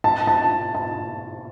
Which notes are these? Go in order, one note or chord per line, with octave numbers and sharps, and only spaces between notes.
A5
A5
A5